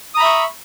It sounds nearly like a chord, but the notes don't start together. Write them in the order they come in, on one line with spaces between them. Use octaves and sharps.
D#6 A#5 B5 E5 C#6